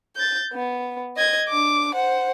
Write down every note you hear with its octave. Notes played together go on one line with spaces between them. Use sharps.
G6 A6
B3
D#5 G#6
D4 D6
C5 F#5